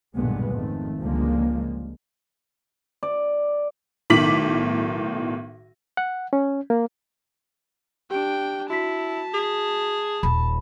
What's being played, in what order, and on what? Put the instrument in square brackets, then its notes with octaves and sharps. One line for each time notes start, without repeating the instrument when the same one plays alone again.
[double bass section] B1 G2 A#2 D3 G#3 B3
G#1 F2 D#3 A3
C#2 D3 F3 G3 G#3 A#3
[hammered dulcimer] D5
[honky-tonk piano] B1 A2 D#3 D6 B6 F#7
[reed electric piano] F#5
C#4
A#3
[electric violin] D4 G5 [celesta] G4 D7
[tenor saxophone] E4 [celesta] F#4 B6 [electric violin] A5
[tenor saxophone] G#4
[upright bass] D#1 [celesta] B5